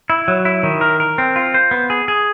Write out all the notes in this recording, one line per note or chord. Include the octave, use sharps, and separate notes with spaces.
E4
F#3
E4
D#3
A#4
A#4
C4
F4
C5
B3
G#4
G#4